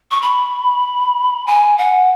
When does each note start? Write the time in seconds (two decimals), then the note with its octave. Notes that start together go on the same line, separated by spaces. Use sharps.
0.11 C#6
0.22 B5
1.47 G#5
1.78 F#5